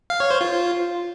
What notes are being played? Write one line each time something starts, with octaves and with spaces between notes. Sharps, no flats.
F5
C#5
C5
F4